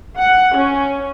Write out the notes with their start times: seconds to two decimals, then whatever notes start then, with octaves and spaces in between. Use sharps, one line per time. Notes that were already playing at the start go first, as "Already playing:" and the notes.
0.17 F#5
0.56 C#4